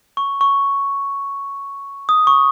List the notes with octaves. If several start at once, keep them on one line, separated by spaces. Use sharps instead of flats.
C#6
C#6
D#6
C#6